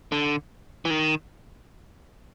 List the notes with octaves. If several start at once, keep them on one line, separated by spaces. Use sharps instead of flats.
D3
E3
D#3